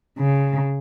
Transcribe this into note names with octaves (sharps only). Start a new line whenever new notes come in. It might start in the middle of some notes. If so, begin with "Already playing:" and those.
C#3